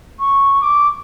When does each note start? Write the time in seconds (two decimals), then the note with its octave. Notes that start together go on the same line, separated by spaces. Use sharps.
0.19 C#6
0.62 D6